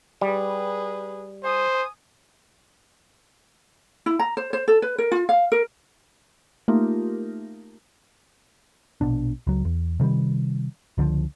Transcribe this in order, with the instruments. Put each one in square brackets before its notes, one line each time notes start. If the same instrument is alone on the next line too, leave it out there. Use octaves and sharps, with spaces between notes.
[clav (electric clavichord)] G3 [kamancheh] G#4 B4
[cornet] C5 [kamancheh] G#5 D#6
[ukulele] E4
A#5
C5
C5
A4
B4
A#4
F4
F5
A#4
[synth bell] A3 A#3 D#4 F4 G4 A#4
[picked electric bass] A#1 B2 D4
C#2 F#3
E2
C3 D#3 F3 G3
C#2 D3 D#3 F3